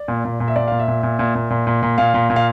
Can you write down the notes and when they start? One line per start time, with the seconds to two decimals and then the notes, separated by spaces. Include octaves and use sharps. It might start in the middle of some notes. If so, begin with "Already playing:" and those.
Already playing: D5
0.08 A#2
0.25 A#2
0.40 A#2
0.48 E5
0.56 A#2 D5
0.68 A#2 F5
0.79 E5
0.88 A#2
1.03 A#2
1.19 A#2
1.35 A#2
1.50 A#2
1.67 A#2
1.83 A#2
1.98 A#2 F5
2.14 A#2
2.30 A#2
2.36 F5